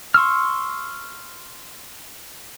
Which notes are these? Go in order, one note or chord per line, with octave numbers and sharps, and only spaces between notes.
C6 C#6 E6 F6